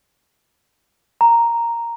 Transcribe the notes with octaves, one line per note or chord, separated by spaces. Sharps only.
A#5